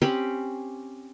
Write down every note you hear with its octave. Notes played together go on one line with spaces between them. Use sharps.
C4 C#4 G4 B5